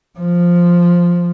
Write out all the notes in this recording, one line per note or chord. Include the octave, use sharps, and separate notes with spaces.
F3